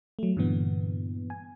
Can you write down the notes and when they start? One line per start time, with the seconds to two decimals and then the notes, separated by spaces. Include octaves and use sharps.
0.19 F#3 A3
0.37 G2 A#2 D3 E3 B3
1.30 G#5